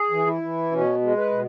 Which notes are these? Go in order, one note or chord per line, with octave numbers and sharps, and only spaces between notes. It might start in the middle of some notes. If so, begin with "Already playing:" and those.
Already playing: G#4
E3
E4
E3
B2 C#4
G#3
B4
B2